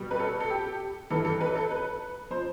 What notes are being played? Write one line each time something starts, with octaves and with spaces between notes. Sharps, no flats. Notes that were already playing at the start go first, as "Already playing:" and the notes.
Already playing: B2 G3
B4
A4
A4
G4
G2 E3 G3 A4
A4
B4
A4
B4
F3 C5